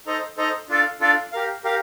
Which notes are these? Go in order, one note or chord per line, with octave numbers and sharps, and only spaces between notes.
D#4 A4 C5 D#5
D#4 A4 C5 D#5
D4 F4 A4 D5 F5
D4 F4 A4 D5 F5
G4 A#4 F5
G4 A#4 F5